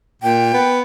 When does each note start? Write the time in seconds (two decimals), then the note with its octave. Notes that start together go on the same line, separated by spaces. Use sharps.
0.22 A#2 G5
0.54 B3